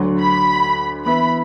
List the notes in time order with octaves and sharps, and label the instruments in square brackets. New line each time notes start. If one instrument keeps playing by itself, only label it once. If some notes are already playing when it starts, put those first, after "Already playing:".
Already playing: [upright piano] D2 D3 F#3
[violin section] B5
[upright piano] E3 B3 E4 [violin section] B5